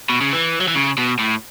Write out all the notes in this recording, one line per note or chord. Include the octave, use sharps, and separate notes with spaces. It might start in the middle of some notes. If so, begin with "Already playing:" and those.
B2
C#3
E3
F#3
E3
C#3
B2
A2